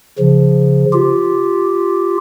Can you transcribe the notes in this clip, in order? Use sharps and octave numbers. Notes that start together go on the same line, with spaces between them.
C#3 F3
F4 G4